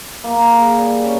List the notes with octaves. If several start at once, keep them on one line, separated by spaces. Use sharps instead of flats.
A#3
G#4
G3
C#4